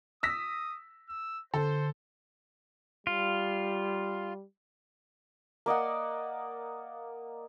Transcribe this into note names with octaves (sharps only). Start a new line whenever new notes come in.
D#6 E6 A#6 B6
E6
D3 A4 C5
G3 F4
A#3 D5 D#5 F#5